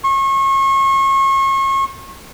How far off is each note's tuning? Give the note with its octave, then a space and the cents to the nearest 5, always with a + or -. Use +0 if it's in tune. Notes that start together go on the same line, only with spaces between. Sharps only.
C#6 -35